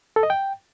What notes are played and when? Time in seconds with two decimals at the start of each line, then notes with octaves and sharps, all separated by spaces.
0.16 A4
0.23 D#5
0.30 G5